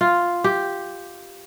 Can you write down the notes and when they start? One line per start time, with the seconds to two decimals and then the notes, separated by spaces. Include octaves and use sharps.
0.01 F4
0.44 G4